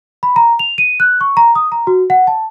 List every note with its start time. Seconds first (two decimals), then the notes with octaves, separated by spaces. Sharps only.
0.23 B5
0.36 A#5
0.59 F7
0.78 D#7
1.00 F#6
1.21 C#6
1.37 A#5
1.55 D#6
1.72 A#5
1.87 F#4
2.10 F#5
2.27 A5